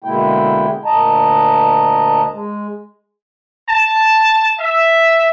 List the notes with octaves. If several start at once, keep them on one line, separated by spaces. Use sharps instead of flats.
B2 D3 G#3 A#3 E4 G5
D2 A#2 D#5 A5 A#5
G#3
A5
E5